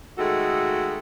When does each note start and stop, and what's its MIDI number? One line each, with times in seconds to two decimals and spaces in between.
0.17 0.99 51
0.17 0.99 56
0.17 0.99 57
0.17 0.99 66
0.17 0.99 69